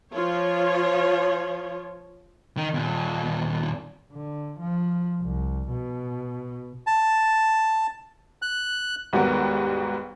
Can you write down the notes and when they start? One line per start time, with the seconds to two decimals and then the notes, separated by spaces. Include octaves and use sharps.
0.12 F3 F4 C#5
2.57 D#3
2.74 D#2 A#2
4.12 D3
4.60 F3
5.22 C2
5.69 B2
6.87 A5
8.42 F#6
9.13 D#2 G#2 G3 B3 F#4 A#4